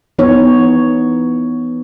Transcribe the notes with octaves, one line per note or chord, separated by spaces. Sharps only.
E3 B3 D#4 C#5